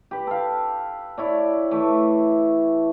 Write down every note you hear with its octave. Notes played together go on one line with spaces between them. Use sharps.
G4 B4
A4 F5
E4 C#5 D5
E3 A3